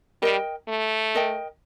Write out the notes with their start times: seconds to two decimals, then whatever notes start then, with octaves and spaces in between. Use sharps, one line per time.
0.22 G3 A#4 D#5 G5
0.68 A3
1.15 A#4 D#5 G5